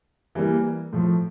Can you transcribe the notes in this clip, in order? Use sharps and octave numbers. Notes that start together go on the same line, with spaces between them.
E3 G3 A#3
A2 F3 A3